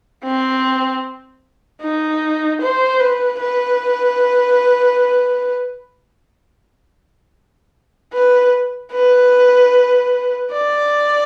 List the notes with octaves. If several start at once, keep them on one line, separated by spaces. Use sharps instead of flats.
C4
D#4
C5
B4
B4
B4
B4
D5